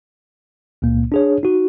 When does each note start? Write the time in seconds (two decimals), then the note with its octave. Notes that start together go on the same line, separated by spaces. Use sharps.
0.82 C#2 A#2 A#3
1.12 D4 G#4 C#5
1.43 D#4 F#4